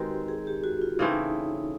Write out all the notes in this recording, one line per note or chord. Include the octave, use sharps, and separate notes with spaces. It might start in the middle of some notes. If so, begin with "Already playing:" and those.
Already playing: D#3 G#3 C4 F#4 G4 B4
G#4
G4
F#4
F4
C#3 E3 A3 C4 D#4